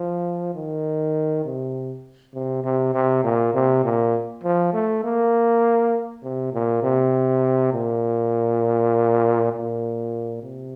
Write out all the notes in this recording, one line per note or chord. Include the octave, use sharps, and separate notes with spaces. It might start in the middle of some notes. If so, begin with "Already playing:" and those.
Already playing: F3
D#3
C3
C3
C3
C3
A#2
C3
A#2
F3
A3
A#3
C3
A#2
C3
A#2
A#2
C3